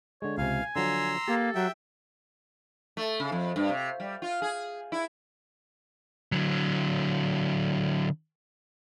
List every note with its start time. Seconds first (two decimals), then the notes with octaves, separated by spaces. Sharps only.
0.22 D3 G#3 C#5
0.38 C#2 C3 F5 G#5
0.76 D3 F3 F#3 A#5 C6 E6
1.28 A#3 G4 A4
1.55 F#3 E5 G5
2.97 A3
3.20 C#3
3.32 F2
3.56 G2
3.69 C3
4.00 G3
4.22 F4
4.42 G#4
4.92 E4
6.32 D3 F#3